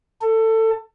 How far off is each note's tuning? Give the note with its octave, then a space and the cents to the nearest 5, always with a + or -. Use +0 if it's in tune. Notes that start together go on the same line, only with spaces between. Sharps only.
A4 +20